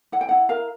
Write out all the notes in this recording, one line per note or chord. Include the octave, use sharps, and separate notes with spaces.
E4 F#5
G5
E4 F#5
A#4 F5